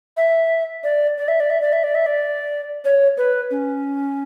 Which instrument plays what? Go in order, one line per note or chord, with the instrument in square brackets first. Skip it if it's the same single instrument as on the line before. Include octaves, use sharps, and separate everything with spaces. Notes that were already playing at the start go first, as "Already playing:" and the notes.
[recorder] E5
D5
D5
E5
D5
E5
D5
E5
D5
E5
D5
C#5
B4
C#4